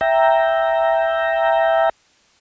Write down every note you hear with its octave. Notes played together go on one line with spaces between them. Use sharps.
E5 G5 A#5